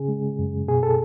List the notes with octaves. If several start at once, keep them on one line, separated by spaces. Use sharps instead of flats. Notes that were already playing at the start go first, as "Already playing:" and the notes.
Already playing: C#3 C#4 G#4
G#3
F#2
B2 G#4
A4